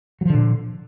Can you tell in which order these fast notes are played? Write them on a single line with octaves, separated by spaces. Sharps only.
F#3 F3 D3 A#2